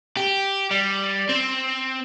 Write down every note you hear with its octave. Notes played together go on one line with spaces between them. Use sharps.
G4
G3
C4